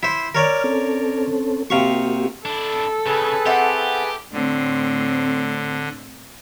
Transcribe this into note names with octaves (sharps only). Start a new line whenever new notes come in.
E4 C5
A#4 C#5 D5 F6
C4 C#4 A4
C3 A#3 F#4 G4 F5 C#6
D4 E4 A4
C#3 G#4 B4 A5
C4 G4 E5 F#5
A2 D3 C4